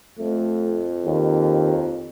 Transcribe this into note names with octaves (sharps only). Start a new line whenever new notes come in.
F2 A3
D#2